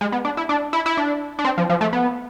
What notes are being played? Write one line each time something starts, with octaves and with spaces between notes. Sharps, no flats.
G#3
B3
D4
E4
D4
E4
E4
D4
D4
C4
F3
F3
A3
B3